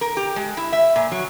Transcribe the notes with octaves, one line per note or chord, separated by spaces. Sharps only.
A#4
G4
G#3
E4
E5
A#2
F#3